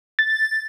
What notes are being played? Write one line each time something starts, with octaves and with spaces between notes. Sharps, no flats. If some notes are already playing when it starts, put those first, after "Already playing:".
A6